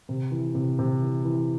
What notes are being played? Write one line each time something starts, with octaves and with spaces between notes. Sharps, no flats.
C3
E3
C3
C3
E3
E3